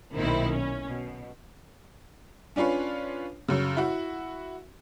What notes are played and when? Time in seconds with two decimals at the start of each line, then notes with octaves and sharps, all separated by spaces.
0.17 B1 A#2 D#3 C4 E4
0.51 C#4
0.89 B2
2.56 C#4 D4 F4 B4 C#5
3.48 F#2 C#3
3.77 E4 F#4